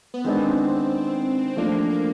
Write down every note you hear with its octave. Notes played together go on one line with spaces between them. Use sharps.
B3
D#3 G#3 B3 C4 D4
F3 A3 A#3 D4
A#3